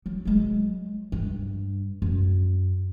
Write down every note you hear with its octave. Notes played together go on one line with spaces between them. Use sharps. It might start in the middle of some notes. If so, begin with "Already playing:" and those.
F#3
F#3 G#3
G2
F#2